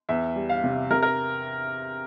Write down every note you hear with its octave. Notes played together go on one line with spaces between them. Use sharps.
E2 E5
G3
F5
C3
C3 A#4
A#4